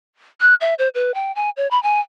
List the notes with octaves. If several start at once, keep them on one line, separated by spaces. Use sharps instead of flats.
F#6
E5
C5
B4
G5
G#5
C#5
B5
G#5